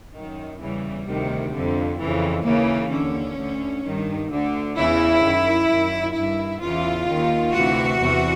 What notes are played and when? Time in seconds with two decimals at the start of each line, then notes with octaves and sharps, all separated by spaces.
0.14 F#2 D#3
0.61 E2 C#3 E3 G3
1.06 D2 C3 D#3
1.53 F2 D3
1.99 F2 C#3 E3
2.45 D#2 C#3 E3 A#3
2.91 D#2 D3 C#4
3.38 D2 D3
3.84 G2 D#3
4.30 D2 D3
4.77 E2 C#3 E3 E4
5.23 F#2 D#3
5.69 F#2 D#3
6.14 G2 E4
6.20 D#3
6.61 E2 C#3 E3 F4
7.07 D#2 D#3
7.54 D2 C3 E3 F#4
8.00 E2 C3 E3